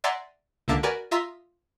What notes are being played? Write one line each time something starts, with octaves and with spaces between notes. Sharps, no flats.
D5 E5 F#5 G#5 A#5 C6
C#2 D3 A#3 E5 A5 D6
F#4 A#4 B4 D5 G#5
F4 E5 A#5 C6 D#6 E6